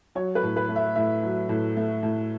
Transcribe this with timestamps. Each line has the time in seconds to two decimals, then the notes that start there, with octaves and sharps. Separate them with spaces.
0.15 F#3 C#5
0.35 B4
0.43 A2
0.56 B4
0.69 A3
0.76 E5
0.95 A2 E5
1.23 F#3
1.49 A2
1.77 A3
2.03 A2